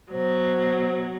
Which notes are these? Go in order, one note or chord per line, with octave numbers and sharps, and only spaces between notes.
B2 F#3 C5